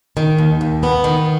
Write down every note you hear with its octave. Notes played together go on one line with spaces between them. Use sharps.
D#3
D#2
D#2
B3
D#3